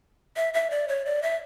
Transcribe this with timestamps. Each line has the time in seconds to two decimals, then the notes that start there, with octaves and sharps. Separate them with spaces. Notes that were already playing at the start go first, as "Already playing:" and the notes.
0.37 E5
0.54 E5
0.70 D5
0.88 C#5
1.05 D5
1.22 E5